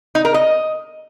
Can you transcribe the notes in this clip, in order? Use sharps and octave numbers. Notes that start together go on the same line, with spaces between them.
D#4
A#4
D#5